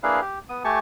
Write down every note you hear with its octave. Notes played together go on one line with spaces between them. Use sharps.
A#3 D4 E4 G#4 B4 F5
G4
B3 D#6
A3 G4 G#5 A5 C#6